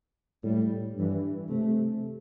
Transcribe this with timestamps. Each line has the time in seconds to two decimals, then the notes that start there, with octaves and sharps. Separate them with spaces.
0.43 A2 G3
0.96 G2 E3
1.50 C3 A3